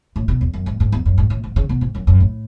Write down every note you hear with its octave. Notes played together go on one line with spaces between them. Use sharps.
A2
B2
E2
F#2
G#2
G#2
E2
F#2
G#2
A2
G#2
C#3
B2
G#2
F#2
F#2
A2